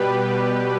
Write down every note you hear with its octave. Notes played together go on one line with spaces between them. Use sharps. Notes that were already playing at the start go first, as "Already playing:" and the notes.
Already playing: B2 G3 G4 B4